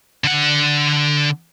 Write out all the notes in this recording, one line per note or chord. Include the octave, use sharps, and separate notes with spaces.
D3 F#5